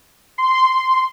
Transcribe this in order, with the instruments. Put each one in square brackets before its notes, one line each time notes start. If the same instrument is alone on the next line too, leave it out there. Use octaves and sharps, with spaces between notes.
[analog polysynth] C6